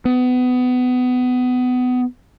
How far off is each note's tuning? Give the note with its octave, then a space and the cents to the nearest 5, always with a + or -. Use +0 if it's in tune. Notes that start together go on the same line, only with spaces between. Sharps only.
B3 +25